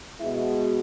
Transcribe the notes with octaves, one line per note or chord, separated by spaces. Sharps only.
B2 G#3 E4